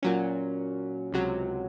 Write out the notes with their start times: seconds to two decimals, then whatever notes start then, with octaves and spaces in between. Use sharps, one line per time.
0.03 A#2 F#3 C#4
1.12 C#2 C3 F#3